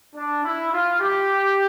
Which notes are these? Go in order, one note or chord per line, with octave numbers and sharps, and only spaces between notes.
D4
E4
F4
G4